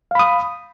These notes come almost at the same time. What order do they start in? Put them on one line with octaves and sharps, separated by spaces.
F5 B5 D#6